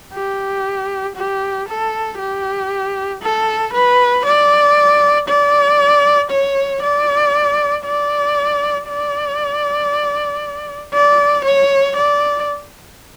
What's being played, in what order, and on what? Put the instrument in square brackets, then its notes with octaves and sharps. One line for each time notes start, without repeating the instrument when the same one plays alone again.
[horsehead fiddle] G4
G4
A4
G4
A4
B4
D5
D5
C#5
D5
D5
D5
D5
C#5
D5